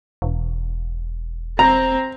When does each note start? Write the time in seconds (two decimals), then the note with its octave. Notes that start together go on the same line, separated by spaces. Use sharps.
0.22 E1
1.59 C4 A#5